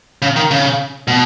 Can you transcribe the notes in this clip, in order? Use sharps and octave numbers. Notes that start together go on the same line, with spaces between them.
C#3
D#3
C#3
B2